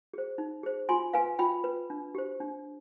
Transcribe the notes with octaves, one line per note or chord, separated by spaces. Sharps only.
G#4 C5
D#4
G#4 C5
F4 G#5 C6
B4 F5 G#5
F4 G5 B5
B4
D4
G4 C5
D4